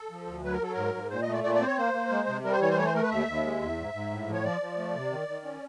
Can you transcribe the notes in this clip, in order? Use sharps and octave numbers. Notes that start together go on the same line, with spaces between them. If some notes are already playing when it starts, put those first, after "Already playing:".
Already playing: A4
F3
D2
F#3 B4
A#4
F#3 A4
G#2 A#4
G#2
A#2 C5
D#5
A3
D5
A#2 D5
D5
C4 C5
C#5
A#3 C5
A#3
G#3
C3
G3 A#4
C5
E3 C#5
C5
A3 C#5
C5
A3 A#4
B4
D#2 E5
D#2
G#3
E2
G#2
G#2
A2
F3
C#5
F3 D5
F3
A3
C3
D#3
D#3
C#4